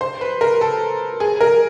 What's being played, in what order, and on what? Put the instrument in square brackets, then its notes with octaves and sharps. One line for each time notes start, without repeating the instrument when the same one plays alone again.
[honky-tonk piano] C5
B4
A#4
A4
G#4
A#4